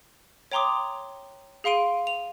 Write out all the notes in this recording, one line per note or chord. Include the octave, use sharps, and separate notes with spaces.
C#5 G5 A#5 C6 D6 D#6
G#4 F5 C6 D7 D#7
F7